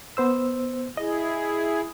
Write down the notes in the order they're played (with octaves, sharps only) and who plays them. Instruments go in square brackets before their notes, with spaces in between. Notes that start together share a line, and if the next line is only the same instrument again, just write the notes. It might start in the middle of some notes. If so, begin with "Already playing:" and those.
[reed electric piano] B3 C5 E6
[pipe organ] E4 G#4 [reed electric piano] D#5